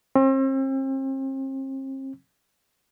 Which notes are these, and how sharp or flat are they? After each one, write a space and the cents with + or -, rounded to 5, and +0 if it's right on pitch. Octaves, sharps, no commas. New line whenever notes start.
C4 +40